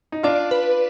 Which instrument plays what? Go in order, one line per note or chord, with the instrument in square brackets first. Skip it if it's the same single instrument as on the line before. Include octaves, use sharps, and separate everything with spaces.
[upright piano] D#4
[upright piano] D4 F4 [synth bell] D5
[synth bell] B4